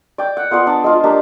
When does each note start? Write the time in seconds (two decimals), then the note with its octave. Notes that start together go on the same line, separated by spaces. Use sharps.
0.18 D5 G5
0.37 F#5
0.51 B3 F4 G#4 D5
0.67 D4
0.84 G#3 F4
1.03 A#3 D4 G4